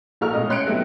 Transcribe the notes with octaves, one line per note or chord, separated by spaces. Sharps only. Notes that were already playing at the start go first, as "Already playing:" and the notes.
A#1 F#4 A4 A#4 C#6 F6
C#2 A2 D#5
D2 C#4 C6 F#6 C#7 D7
F#3 A3 B3 D#4 G4